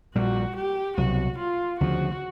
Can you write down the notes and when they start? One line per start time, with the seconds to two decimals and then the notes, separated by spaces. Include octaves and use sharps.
0.15 A#1 A#2 G3 F#4
0.56 G4
0.97 C2 B2 F#3 F#4
1.38 F4
1.80 D2 C#3 F3 F#4